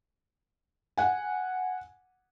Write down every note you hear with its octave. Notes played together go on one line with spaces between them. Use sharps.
F#5 G#5